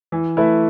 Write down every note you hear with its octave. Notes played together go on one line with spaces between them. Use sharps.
E3
A3 E4 B4 E5